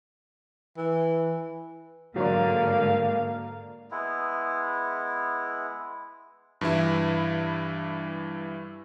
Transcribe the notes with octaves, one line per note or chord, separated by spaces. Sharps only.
E3
G#2 D3 F#3 A#3 D5 F5
G#3 B3 E4
G2 E3 E4